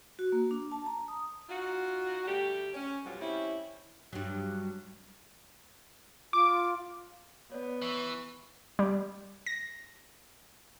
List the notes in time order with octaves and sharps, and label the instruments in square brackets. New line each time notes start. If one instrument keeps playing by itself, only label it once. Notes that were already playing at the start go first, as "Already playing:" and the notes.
[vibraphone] F#4
A#3
D4
A5
A#5
D#6
[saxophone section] D#4 F4 F#4
D2 G3 A3 G4
C#4
F2 B2 F#3 G3 F4
G3 C4 C#4 E4
[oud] G2 F#3
[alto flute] F4 [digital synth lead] D6
[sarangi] B3 [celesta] C#5 D5
[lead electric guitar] E3 [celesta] C#6 E6
[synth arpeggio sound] G3
A#6